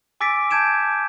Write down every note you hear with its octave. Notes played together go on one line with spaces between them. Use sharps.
G#5 D6 E6 A6 B6 D7
A5 G6 G#6 D7 E7